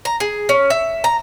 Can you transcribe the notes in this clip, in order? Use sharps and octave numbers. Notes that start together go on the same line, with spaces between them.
A#5
G#4
C#4
E5
A#5